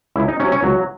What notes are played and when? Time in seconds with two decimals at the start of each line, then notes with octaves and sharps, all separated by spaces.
0.16 C#2 E4
0.28 D#4
0.40 C3 F#3 C#4
0.52 C#4
0.63 C#2 F#3